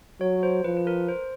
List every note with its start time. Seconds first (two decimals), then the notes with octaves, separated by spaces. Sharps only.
0.21 F#3 C#5
0.43 C5
0.64 F3 B4
0.77 B4
0.87 A#4
1.08 C5